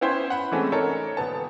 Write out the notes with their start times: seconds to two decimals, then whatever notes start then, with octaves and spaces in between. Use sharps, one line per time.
0.01 B3 C#4 E4 C5 G5
0.30 F#5 B5
0.52 E3 G#3 A3 C4 C#4
0.72 D#4 A4 A#4 C#5
1.17 D#1 B3 A5